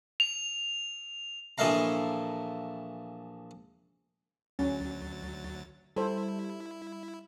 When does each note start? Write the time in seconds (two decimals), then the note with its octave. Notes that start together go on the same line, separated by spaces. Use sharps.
0.20 F7
1.58 A#1 E3 A3 D#5 F5 A#5
4.59 D2 F#3 C#4 A6
5.96 G3 E4 A4 C5